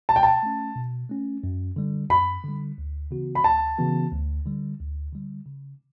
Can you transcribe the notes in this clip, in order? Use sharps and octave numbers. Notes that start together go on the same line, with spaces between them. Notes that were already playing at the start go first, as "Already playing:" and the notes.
B2 A5
G5
A5
A3 C#4
B2
A3 C#4
F#2
D3 G3
F#2 B5
D3 G3
D2
C#3 E3 B3 F#4
B5
D2 A5
C#3 E3 B3 F#4
D2
D3 G3
D2
D3 G3
C#3